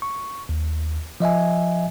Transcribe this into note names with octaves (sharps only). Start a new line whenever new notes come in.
C#6
D#2
F3 D#5 E5 G#5